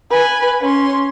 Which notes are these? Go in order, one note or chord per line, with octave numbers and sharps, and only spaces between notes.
B4 G#5
C#4 C6